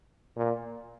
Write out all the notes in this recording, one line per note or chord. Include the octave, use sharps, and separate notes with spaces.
A#2